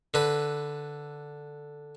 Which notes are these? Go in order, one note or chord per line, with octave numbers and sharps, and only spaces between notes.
D3 B4